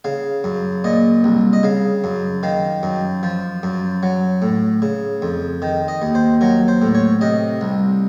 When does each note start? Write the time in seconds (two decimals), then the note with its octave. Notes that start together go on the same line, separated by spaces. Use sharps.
0.04 C#3 F5
0.44 F#2
0.84 A#2 D#5
1.24 C2
1.53 D#5
1.63 C#3 F5
2.04 F#2
2.43 D#3 F5
2.83 F#2
3.23 F3
3.63 F#2
4.03 F#3
4.42 A2
4.82 C#3
5.22 F2
5.62 D#3
5.88 D#5
6.02 D#2
6.15 C5
6.41 F#3 A#4
6.68 C5
6.82 A2
6.95 C#5
7.21 C3 D#5
7.61 C2